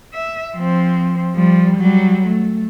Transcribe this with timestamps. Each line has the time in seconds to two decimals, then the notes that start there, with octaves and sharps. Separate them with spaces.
0.14 E5
0.55 F3 C4
1.35 F3 G3
1.77 F#3 G3
2.26 A3